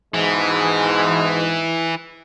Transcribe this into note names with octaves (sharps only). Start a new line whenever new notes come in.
G#2 B2 E3 G#3